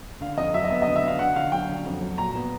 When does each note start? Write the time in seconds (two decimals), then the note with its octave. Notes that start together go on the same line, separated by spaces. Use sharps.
0.21 D3 F5
0.37 F2 D#5
0.54 F#3 E5
0.64 D#5
0.71 B3 E5
0.82 D3 D#5
0.96 E5
1.04 D3 F5
1.19 D3 F#5
1.35 D3 F5
1.52 F#3 G5
1.69 D3
1.85 F2
2.01 F#3
2.18 A#2 A#5
2.35 B3